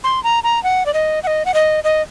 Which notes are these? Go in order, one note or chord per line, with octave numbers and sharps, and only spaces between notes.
C6
A#5
A#5
F#5
D5
D#5
F#5
D#5
F#5
D#5
D#5